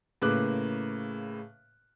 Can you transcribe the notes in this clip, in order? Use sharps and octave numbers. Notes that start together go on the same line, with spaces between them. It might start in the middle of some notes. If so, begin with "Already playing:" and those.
A2 C#3 A#3 B4 D6 F#6